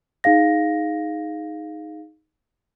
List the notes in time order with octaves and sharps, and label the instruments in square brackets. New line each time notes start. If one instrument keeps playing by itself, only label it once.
[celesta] D#4 G#4 F5 A#6